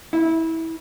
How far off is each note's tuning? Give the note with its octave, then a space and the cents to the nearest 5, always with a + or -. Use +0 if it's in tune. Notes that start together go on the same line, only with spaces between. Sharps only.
E4 -20